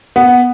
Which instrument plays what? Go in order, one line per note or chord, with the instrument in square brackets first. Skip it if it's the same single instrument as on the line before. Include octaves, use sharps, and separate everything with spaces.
[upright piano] B3